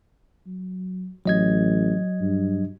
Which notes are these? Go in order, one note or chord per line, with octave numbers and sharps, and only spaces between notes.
F#3
A1 F#3 D#5 G#6
G2